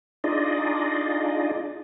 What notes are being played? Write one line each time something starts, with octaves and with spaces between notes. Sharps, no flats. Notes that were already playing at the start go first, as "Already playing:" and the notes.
D4 D#4 F4 G#4 D5 D#5